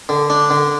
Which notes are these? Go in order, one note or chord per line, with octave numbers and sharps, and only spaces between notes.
D3
D4
D3